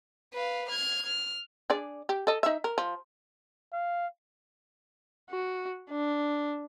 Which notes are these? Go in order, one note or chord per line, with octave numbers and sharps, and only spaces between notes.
B4 F5
F6 G#6
F6
D4 G#4 D5
G4
A4 D#5
D#4 E5
A#4
F3
F5
F#4
D4